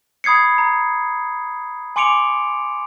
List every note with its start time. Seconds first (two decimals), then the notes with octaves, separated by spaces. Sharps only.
0.24 B5 D#6 G#6 C7 C#7
0.58 A#5
1.96 G#5 C6 D6 C#7 D7 F7